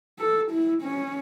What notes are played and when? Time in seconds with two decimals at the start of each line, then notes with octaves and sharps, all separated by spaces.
0.19 A4
0.52 E4
0.82 C#4